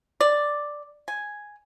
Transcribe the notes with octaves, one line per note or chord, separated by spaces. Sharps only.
D5
G#5